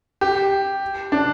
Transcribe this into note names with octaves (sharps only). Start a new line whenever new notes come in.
G4
D4